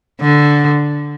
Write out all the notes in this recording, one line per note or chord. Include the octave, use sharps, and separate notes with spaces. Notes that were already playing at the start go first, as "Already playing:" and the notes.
D3